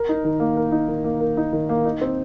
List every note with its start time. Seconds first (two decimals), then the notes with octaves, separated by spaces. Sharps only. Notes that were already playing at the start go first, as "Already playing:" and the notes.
Already playing: A#4
0.09 D#4
0.24 D#3
0.40 A#3
0.57 A#4
0.72 D#4
0.88 D#3
1.04 A#3
1.21 A#4
1.37 D#4
1.53 D#3
1.69 A#3
1.85 D#4
2.01 C4